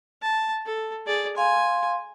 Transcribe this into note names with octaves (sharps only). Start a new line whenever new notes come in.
A5
A4
G#4 D5
F5 G#5 C6